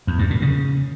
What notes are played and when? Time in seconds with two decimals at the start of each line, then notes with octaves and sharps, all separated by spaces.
0.07 E2
0.19 G2
0.30 A#2
0.42 C#3